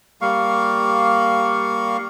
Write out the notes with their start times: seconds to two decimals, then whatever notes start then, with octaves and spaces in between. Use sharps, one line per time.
0.21 G3 A#3 F5 C#6